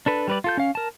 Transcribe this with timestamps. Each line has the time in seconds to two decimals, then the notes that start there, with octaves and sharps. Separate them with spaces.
0.06 D4 A4 B4
0.28 G3 B4 D5
0.44 F4 A4 G6
0.57 C#4 F5
0.75 A#4 A5